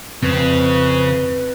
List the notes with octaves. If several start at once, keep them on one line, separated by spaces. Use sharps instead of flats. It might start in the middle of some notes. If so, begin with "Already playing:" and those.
F2 C#3 C4 B4